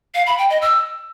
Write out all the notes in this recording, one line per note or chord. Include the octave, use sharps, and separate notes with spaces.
F5
B5
G5
D#5
E6